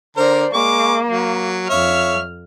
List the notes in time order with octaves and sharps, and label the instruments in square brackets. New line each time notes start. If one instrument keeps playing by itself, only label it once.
[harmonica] D3 A#4 A#5 [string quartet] C5 D5
[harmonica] G#3 C#6 D6 [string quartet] A#3
[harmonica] F#3
[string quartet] F2 F6 [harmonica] C#5 E5 F5